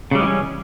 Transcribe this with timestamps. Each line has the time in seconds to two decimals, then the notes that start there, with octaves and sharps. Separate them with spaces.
0.11 C#3
0.15 G3
0.19 G#3
0.22 E3
0.26 C#4